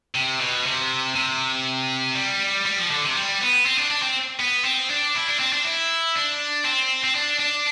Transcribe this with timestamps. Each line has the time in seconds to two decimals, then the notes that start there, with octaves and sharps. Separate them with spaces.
0.15 C3
0.41 B2
0.66 C3
1.16 C3
2.15 G3
2.66 G3
2.77 F3
2.91 D3
3.03 C3
3.16 G3
3.40 B3
3.66 C4
3.78 D4
3.91 D4
4.03 C4
4.40 B3
4.65 C4
4.90 D4
5.15 E4
5.27 D4
5.39 C4
5.53 D4
5.64 E4
6.15 D4
6.65 C4
7.04 C4
7.15 D4
7.40 D4